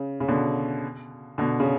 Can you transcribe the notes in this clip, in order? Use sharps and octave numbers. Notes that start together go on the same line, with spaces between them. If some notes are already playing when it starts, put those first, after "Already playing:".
Already playing: C#3
C#3
B2 D3
B2 D3
C#3